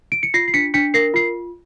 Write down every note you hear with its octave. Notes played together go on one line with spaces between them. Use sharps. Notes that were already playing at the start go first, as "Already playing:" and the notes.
D7
C#7
F4 A#6 C7
C7
D4 B6 C#7
D4 B6 C#7
A#4 A#6 C7
F4 C7